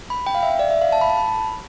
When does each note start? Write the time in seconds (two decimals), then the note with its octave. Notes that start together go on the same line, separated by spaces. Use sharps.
0.10 B5
0.27 G5
0.35 F5
0.43 E5
0.59 D5
0.71 E5
0.82 F5
0.92 A5
1.01 B5
1.10 A5
1.17 B5